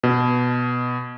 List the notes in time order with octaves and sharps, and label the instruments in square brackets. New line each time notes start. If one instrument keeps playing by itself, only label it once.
[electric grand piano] B2